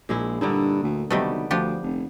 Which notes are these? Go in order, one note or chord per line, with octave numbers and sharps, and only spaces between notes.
A#1 A#2 G#3 E4
G2 D3 D#4 E4
D2
B1 C3 D#3 G3 A3 B3
D2 F3 D4 G4
F1